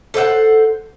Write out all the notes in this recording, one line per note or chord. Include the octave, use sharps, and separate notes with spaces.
A4 C5 E5 F#5